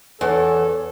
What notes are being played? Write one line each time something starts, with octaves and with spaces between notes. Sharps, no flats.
E2 A4 C#5